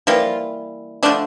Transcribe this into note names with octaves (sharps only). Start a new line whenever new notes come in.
E3 F3 G3 A#3 F4
D3 F3 A3 D4